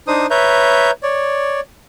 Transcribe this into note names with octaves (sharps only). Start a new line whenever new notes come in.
D4 D#4 C5 D#6
B4 C#5 E5 A#5 G6
C#5 D5